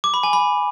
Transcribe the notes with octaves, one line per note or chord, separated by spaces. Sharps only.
D6
B5
G#5
B5